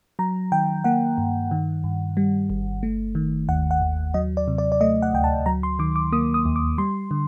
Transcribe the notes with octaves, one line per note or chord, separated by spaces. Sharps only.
F#3 A#5
D#3 G5
A#3 F#5
G2
D#3
G2
G3
G1
A3
D#3
D#2 F#5
F#5
D#2
F#3 D#5
D5
C3
D5
D5
A3 D#5
F#5
D2 G5
A5
F#3 A#5
C6
D#3 D6
D6
A#3 D#6
D#6
D#2
D6
G3 C6
D3